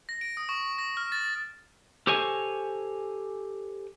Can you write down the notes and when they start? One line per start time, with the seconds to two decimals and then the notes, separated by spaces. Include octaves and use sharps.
0.09 A#6
0.21 D7
0.37 D#6
0.49 C#6
0.78 A#6
0.97 F6
1.12 A6
2.07 G4 A4 C5 C#5 D#5 G#5